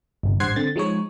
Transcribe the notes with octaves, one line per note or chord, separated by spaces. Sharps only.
G1 C2
A1 G2 C5 F#5 G#6 C7
D3 C4 A6
F3 G#3 D#4 C#5